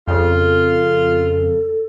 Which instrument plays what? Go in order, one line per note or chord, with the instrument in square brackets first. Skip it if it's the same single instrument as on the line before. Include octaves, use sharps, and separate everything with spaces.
[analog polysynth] F2 C#3 [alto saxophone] F4 [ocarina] A4